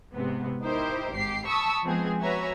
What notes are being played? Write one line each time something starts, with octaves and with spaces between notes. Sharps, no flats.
G#2 C3 B3
D#4 E4 G4 A#4 C5
G#1 G#2 G4 C7
A5 B5 C#6 D#6 E6
F3 G#3 B3 C4 G#4
F#4 B4 C#5 E5 G#5 A#5